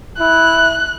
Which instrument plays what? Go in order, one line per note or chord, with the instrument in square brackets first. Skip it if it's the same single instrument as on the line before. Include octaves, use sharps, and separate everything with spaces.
[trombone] E4 [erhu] F#6